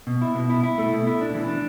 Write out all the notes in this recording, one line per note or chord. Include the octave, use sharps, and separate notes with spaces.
B2
E4
B2
E4
E4
A3
B2
E4
D4
E3
D4